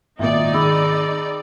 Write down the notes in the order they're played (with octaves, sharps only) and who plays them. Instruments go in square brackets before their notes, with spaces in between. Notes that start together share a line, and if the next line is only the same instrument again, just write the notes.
[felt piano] G#1 A#2 [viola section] D#4 D5 [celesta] E5
[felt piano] D#3 [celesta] G#4 B5 E6